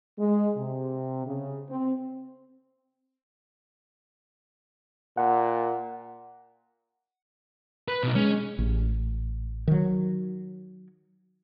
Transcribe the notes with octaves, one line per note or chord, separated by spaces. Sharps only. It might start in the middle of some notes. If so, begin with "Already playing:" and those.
G#3
C3
C#3
C4
A#2 F#5
B4
B2 D#4
G#3 C#4
A1
D#3 F#3